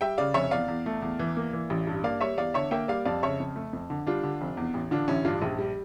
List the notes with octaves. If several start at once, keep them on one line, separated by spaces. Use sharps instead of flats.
G3 E5 G5
C#3 D5 F5
F1 C#5 E5
E2 D5 F5
E2
A3
E2
E3
A#3
E3
A1
G2
A#3 D5 F5
G3 C#5 E5
E2 D5 F5
D3 C#5 E5
A#3 E5 G5
G3 D5 F5
F2 D5 F5
C#3 C#5 E5
F2
A3
F2
D3
G3 D4 F4
D3
F1
E2
A1
D3 D4 F4
A1 C#4 E4
G2 D4 F4
A#1
G3